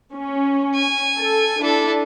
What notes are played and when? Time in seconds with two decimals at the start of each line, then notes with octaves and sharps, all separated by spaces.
0.13 C#4
0.75 G#5
1.17 A4
1.61 D4 E4 A4